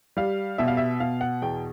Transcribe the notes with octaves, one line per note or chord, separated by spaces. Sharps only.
G3 F5
B2 E5
F5
E5
B2 F5
F#5
E2 G5